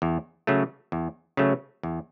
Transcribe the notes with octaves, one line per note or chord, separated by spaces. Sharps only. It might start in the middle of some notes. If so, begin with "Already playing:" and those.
E2
C#3 F#3 A3
E2
C#3 F#3 A3
E2